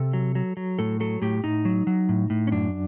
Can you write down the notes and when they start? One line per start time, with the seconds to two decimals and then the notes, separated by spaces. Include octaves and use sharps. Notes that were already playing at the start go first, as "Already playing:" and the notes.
Already playing: C3 A4
0.13 F#3
0.35 F#3
0.57 F#3
0.79 A2 A4
1.00 F#3 A4
1.22 A2 G4
1.44 A2 D#4
1.65 F#3
1.87 F#3
2.09 A2
2.30 A2
2.47 C#4
2.52 F#2 D4